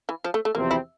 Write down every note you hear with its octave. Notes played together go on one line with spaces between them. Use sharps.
E3
F3
A3
A3
E2 C3 F3 A#3 C4
E4